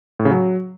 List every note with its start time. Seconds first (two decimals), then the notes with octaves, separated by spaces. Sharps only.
0.19 A2
0.25 C#3
0.31 F#3